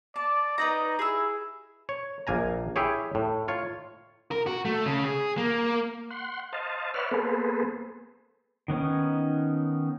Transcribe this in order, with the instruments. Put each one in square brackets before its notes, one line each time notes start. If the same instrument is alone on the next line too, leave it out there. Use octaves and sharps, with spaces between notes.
[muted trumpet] D5 [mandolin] A5
[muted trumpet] D#4 [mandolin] B4 D5 A#5
[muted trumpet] E4 [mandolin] G#4 E6
[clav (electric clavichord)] C#5
A#1 A#3 G#5 A#5
E4 G4 G#4 C#5
A2
F4 C#5
[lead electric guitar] A#4
F#4
A3
C#3
G#4
A#3
[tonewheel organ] F#5 C6
C5 D#5 F5 A5
B4 C#5 D5 E5 F#5 F6
A#3 B3 G#4 A4 B4 C5
[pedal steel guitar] D#3 B3 C#4 D#4